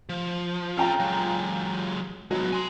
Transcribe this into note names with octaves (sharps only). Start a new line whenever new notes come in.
F3
C#4 F4 A4 G5 A#5
F#3 G#3
F#3 G#3 B3
G#5 C6